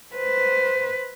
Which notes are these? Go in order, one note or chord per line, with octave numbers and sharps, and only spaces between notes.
B4 C5